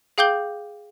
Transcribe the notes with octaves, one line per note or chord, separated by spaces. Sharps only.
G#4 F5 G5 D6 G6 G7